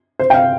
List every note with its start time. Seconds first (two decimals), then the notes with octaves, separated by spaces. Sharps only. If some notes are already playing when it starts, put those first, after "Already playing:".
0.19 C5
0.30 G5
0.34 F5